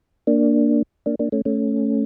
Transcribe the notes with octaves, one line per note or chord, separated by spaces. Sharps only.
A#3 D4
A#3 D4
A#3 D4
A3 C#4
A3 C#4